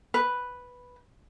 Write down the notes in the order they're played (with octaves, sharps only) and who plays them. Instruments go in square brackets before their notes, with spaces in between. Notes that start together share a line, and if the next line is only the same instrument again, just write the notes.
[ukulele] B4